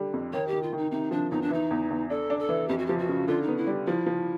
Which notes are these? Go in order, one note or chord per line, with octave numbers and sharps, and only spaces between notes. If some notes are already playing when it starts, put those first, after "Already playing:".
Already playing: D3 G3
F2
D#3 C#5
G4
D#3
F4
D#3 D#4
C3 D#4
F3 D4
E2 D#4
D4
E3 D#4
E2
E2
D4 A4
D4
A4
E3
F2 G4
F#4
F3 G4
F#4
C#3
D3 F4
D#4
B3
E4
G3
F3 E4
F3